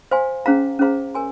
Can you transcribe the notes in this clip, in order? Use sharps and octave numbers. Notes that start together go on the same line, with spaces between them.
C5 F5 G#5 C6
C#4 G#4 C5 F5 A#5
C#4 G#4 C5 F5 A#5
A#4 C#5 G#5 C6